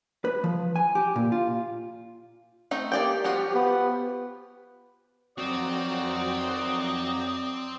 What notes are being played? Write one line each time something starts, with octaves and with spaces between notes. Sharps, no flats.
B4
F3
G#5
G4
A#2
F4
A3 C4 D#4
A#3 G4 D5 G5
F3 F4 F#4
B3
F2 D#3 F#3 C4 F#4 D5 A#5 D#6